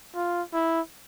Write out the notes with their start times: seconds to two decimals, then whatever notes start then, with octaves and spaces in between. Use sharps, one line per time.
0.15 F4
0.54 E4